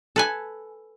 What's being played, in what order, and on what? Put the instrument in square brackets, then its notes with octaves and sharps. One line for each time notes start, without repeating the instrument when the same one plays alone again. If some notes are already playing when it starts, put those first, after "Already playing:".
[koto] A4 B4 G#5